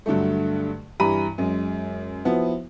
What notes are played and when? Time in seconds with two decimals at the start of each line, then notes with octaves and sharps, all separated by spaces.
0.06 G2 D3 F#3 A3
1.00 G2 E3 G3 A#5 B5 D#7
1.38 F#2 G#3
2.25 F3 B3 E4 F#4